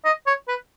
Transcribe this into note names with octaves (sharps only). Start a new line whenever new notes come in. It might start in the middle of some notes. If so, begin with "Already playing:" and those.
D#5
C#5
B4